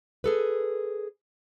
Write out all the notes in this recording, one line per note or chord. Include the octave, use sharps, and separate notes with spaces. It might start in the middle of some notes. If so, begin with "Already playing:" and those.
G#4 A4 B4